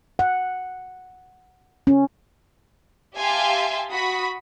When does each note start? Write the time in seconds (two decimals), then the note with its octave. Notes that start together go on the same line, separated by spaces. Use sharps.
0.19 F#5
1.87 C#4
3.16 G4 E5 F5 G#5 A5 C6
3.91 F#4 B5 D#6